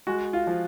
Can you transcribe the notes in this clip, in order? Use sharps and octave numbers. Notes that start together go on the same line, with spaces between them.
G#3 F#4
F4
F3